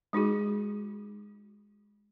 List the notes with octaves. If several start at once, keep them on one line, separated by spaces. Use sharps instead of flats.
G#3 D#4 F#4 G#4